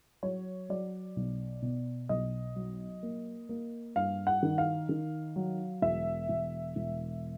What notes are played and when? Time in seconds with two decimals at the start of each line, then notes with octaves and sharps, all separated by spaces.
0.23 F#3 C#5
0.69 F#3 D5
1.16 B1
1.62 B2
2.09 B1 D#5
2.56 F#3
3.03 A#3
3.49 A#3
3.96 G2 F5
4.27 F#5
4.43 D#3
4.58 F5
4.89 D#3
5.36 F#3
5.82 E1 E5
6.29 E1
6.76 E1